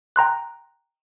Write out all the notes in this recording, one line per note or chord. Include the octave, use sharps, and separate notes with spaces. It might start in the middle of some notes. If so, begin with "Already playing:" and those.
G5 A#5 C6 F#6